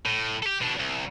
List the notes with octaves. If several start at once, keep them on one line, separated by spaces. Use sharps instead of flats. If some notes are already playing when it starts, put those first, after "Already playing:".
A2
G4 A4
B2 D4
C2